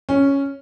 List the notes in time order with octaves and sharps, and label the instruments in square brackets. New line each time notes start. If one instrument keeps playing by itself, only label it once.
[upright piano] C#4